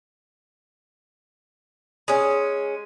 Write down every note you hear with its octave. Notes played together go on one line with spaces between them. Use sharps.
G#3 C#4